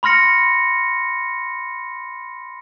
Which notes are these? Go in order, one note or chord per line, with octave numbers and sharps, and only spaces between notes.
B5 C6 F6 A#6 C#7